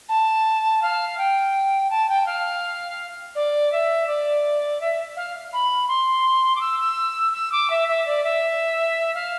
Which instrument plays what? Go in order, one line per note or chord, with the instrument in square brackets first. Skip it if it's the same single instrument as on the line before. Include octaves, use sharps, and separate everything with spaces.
[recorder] A5
F5
G5
A5
G5
F5
D5
E5
D5
E5
F5
B5
C6
D6
E6
E6
E6
D6
E5
E5
D5
E5
F5